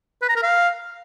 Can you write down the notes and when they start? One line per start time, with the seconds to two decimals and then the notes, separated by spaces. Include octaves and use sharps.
0.22 B4
0.29 A#5
0.36 A#4
0.43 F5